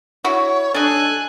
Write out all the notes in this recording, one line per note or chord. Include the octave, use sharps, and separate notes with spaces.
E4 F#4 C#5
D4 D#4 A4 G#5 F#6